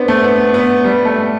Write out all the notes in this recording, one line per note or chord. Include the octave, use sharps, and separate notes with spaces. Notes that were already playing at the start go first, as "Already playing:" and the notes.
Already playing: B3 C4 D4
A3
B3
B3
G3
A3